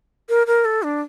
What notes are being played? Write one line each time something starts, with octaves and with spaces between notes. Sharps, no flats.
A#4
A#4
A4
D4